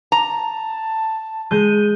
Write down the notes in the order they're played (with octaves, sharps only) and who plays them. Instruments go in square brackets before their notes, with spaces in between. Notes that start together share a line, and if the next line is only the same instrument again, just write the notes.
[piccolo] A5 [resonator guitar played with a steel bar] A#5
[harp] G#3 G6 [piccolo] D#7